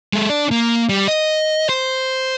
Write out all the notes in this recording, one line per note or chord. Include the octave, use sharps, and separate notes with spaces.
G#3 A4
D4 D5
A#3
G3
D#5
C5